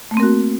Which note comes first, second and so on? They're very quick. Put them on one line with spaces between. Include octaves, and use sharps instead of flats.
A3 A#3 C4 A#4 F#4